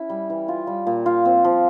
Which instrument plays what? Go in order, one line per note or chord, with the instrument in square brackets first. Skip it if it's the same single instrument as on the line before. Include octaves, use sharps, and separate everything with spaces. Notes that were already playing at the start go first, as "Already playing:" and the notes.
Already playing: [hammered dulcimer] C#4 E4
G3
E3
F4
G3
A#2
F4
C4
F3